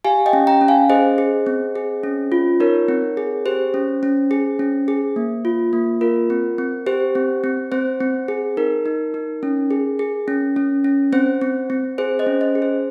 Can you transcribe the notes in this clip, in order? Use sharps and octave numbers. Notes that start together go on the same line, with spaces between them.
G4 F5 G#5
D#5 G5
C#4
G5 A#5
C#4
F5 G#5
G#4 C5 D#5
G#4
C4
G#4
C#4
F4
D#4 A#4 C#5
C4
G#4
G4 C5
C#4
C#4
G#4
C#4
G#4
A#3
F4
A#3
F4 A#4
C4
C4
G4 C5
C4
C4
C4 C5
C4
G#4
D#4 A#4
D#4
D#4
C#4
G#4
G#4
C#4
C#4
C#4
C4 C5
C4
C4
G#4 C5
C5 D#5
C#4
C5 D#5
G#4
C5